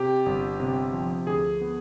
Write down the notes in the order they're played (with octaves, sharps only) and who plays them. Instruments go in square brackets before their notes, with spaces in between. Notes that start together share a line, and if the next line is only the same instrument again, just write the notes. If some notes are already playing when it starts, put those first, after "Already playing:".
Already playing: [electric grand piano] C3 G4
G1
C3
F3
D2 G#4
B3